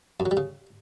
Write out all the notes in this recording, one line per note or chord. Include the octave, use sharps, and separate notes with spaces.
F#2
F#3
G3
C#3